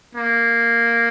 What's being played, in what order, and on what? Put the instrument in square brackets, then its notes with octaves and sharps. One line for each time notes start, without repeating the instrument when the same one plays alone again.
[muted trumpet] A#3